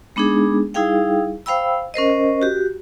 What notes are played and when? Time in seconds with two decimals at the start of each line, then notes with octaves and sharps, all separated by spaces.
0.16 G#3 B3 D4 D#4 G#4
0.74 G3 D#4 E4 G#4 F5 G5
1.46 C5 F5 G5 B5 E6
1.94 C#4 A#4 C5 D#5
2.42 F#4 G4